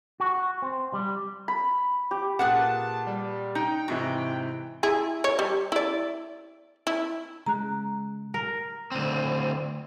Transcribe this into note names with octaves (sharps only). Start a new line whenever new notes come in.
F#4
C4
G3
B5
G4
A#2 G4 G#4 B4 F#5 A5
G3
D#4 G5
G#2 C3 E3 F#4
E4 G#4
C#5
G3
E4 D5
E4
C#3 G#3 A#5 F#6
A#4
D2 C4